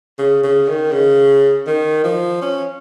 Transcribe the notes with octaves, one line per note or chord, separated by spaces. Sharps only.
C#3
C#3
D#3
C#3
D#3
F3
C#4